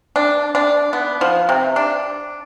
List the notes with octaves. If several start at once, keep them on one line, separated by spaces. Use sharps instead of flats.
D4
D4
B3
F3
C3
D4